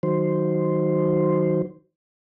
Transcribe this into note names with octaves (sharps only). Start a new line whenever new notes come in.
D#3 F#3 C5